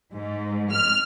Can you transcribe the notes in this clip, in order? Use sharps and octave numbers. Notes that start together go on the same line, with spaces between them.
G#2
F6